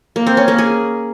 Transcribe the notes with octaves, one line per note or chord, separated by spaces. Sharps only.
A#3
C4
C#4
A#3
G#4